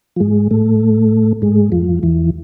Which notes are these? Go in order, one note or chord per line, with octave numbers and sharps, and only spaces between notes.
F3
G#2 G#3
A2 A3
G#2 G#3
F2 F3
E2 E3